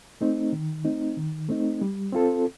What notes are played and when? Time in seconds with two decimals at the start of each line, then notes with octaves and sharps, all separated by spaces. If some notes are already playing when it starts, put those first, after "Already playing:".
0.21 A3 C4 D#4
0.52 D#3
0.84 A3 C4 D#4
1.16 D#3
1.49 A3 C4 D#4
1.81 G3
2.13 C4 F4 A4